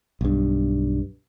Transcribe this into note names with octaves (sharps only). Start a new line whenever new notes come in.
B1 G2